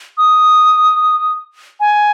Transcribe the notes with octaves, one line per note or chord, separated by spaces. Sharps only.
D#6
G#5